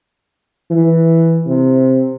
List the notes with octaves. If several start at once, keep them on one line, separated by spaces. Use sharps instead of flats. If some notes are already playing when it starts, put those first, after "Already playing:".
E3
C3